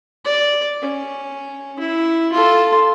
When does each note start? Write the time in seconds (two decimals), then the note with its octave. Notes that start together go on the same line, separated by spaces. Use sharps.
0.25 D5
0.82 C#4
1.79 E4
2.32 F4 A4